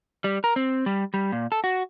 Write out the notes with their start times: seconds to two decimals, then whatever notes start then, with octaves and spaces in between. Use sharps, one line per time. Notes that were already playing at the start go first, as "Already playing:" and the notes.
0.24 G3
0.44 A#4
0.56 C4
0.86 G3
1.14 G3
1.32 A#2
1.52 A4
1.64 F#4